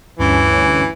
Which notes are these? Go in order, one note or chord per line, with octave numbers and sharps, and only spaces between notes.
D2 G2 E3 C#4